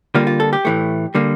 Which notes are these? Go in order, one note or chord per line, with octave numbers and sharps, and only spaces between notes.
D3 G3 A#3 F4
F4
A4
G4
A2 E3 A3
D3 G3 A#3